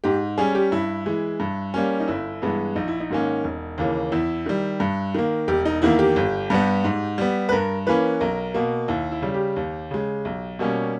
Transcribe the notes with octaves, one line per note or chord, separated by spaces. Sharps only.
G#2 G4
G3 C#4 G#4
G4
G2 E4
E3 G#3
G2
G3 A#3 C#4
D#4
G1 E4
G2 E3 G#3 B3
A#1 D#4
E4
D#4
G#2 D#3 A#3 C#4
E1
D#2 C#3 E3 A#3
E2 E4
D#3 G3
G2
D#3 A#3
E1 G4
D#4
E2 D#3 A#3 E4
G4
G1
G2 G3 B3
G#2
G3 B3
B4
G2 A#4
E3 A#3 C#4 B4
B1 A#4
B2 A#3
D#2 E4
E4
C#3 G3
G4
D#2
C#3 G#3
B1
B2 G3 A#3 C#4